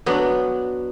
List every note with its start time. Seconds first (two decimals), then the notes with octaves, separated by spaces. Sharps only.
0.06 F#3 B3 D4